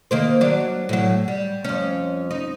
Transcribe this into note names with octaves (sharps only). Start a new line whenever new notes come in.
D#3 A#3 C5
F#3 D4 D5
A2 F#3
G3
F2 C#4
D#4